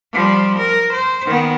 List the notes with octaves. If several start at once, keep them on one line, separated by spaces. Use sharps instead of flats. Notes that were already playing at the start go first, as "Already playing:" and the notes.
F3 G3
A#4
C5
D#3 B3